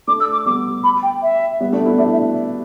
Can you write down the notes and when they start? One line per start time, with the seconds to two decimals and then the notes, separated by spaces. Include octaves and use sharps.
0.07 A3 D4 D6
0.20 E6
0.33 D6
0.46 G3 B3 D6
0.84 B5
1.03 G5
1.22 E5
1.60 G3 B3
1.73 A3 D4
1.86 B3 E4
1.98 A3 D4 E5
2.12 E5